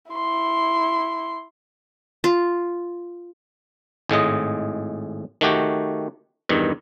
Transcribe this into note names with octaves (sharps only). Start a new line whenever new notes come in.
E4 C6
F4
G#1 A2 G#3 D#5
D#3 A3 F#4 G4
E2 G2 D#3